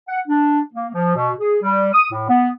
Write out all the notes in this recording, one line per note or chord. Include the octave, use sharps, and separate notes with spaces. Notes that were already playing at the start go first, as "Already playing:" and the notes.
F#5
D4
A#3
F3
B2
G#4
G3
D#6
A2
B3